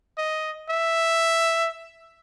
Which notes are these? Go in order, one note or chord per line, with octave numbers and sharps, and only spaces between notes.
D#5
E5